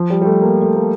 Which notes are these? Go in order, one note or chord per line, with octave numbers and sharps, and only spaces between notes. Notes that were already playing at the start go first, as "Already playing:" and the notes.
Already playing: F3
G3
G3
A3
A#3
A3
A#3